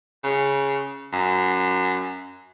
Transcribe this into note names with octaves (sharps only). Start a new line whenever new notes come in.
C#3
F#2